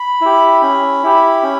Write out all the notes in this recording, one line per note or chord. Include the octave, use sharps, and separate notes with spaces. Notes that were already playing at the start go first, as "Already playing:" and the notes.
Already playing: B5
E4 G4
C#4
E4 G4
C#4